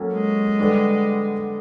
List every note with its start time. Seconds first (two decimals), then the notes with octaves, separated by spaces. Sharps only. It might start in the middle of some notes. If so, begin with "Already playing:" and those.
Already playing: F#3 A#3 C#4 F#4 A4
0.13 G#3
0.59 D3 G3 B3 D4